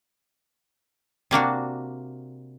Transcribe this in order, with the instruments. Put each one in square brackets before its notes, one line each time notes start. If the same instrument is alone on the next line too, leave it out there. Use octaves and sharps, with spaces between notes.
[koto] C3 A#3 D4 F#4